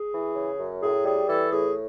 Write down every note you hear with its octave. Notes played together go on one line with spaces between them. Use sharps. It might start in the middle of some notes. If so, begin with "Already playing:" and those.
Already playing: G#4
E3
C#3
F#2
A2 G#4
G3 G#4
E3 A4
A2 G#4